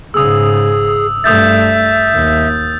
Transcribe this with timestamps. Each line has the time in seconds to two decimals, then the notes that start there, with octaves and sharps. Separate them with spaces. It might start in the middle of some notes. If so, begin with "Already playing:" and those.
0.14 G#2 C#3 G#4 D#6 E6
1.24 G2 A3 E5 D#6 G6 A6
2.13 D#2